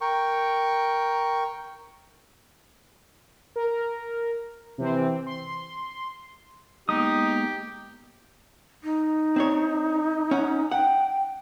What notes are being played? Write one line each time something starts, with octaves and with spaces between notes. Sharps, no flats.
A#4 G5 C#6
A#4
C3 E3 C4
C6
G#3 A#3 B3 D#4 G4 D#6
D#4
C4 D4 C#5
C#4 C#5 F#5
F#5 G5